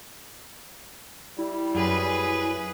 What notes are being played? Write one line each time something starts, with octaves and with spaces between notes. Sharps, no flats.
G3 E4
F#2 G#4 B4